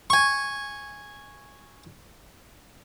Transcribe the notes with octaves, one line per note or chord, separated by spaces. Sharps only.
G#5 C#6